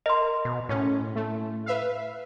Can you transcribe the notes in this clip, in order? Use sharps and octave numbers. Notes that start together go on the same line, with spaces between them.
A#4 D#5 C6
B2
A2 C#4
A3
B4 E5 F5